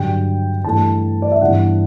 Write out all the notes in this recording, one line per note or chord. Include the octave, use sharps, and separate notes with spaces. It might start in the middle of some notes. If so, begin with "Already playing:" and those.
Already playing: G2 D3 F#3 G5
G2 E3 A3 A5
D5
E5
G2 E3 G3 B3 F#5